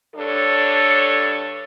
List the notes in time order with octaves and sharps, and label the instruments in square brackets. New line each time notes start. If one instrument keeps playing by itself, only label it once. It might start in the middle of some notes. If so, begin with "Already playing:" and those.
[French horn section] G2 D4 A4 C#5